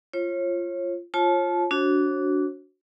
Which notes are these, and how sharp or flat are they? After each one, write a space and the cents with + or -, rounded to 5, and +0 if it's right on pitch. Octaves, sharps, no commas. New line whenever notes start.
F4 -15 C#5 -35
F4 +0 C#5 -35 A5 -25
D4 -25 F#4 +0 C#5 -45